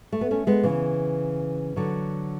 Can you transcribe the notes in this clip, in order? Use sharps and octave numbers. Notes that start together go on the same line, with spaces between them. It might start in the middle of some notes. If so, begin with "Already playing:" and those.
A3
B3
A3 C#4
G#3 B3
C#3 E3
D3 F#3